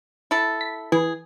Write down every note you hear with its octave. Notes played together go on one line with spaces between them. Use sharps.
E4 A4
B6
E3 G#4